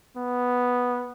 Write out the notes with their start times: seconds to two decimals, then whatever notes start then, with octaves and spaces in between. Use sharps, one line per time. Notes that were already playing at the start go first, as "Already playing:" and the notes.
0.17 B3